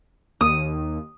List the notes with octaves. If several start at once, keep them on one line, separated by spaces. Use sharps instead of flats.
D#2 D#6